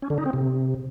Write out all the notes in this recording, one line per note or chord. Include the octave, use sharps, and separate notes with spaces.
C#4
D3
D#4
C4
C3